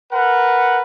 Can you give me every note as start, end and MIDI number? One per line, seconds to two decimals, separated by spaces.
0.12 0.82 70
0.12 0.82 71
0.12 0.82 78